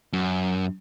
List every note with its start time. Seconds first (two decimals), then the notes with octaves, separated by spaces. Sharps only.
0.13 F#2